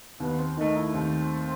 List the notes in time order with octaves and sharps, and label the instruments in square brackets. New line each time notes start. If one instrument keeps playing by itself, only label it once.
[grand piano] D#2 [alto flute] B3
[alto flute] C4
[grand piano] D#3 A3 [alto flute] D#4
[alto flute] E4
[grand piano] D#2 [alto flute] C4